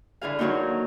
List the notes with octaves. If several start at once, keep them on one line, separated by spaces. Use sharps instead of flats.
D3 E3 G#4 F5
D3 D#3 F#3 A#3 D#4